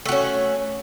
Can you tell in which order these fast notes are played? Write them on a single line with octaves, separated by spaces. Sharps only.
A3 F#4 C#4